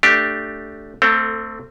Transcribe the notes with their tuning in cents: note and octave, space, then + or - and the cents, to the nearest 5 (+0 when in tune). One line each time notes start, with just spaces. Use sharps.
A3 +5 D4 +0 G4 +0
A3 +30 C4 +0 A4 +20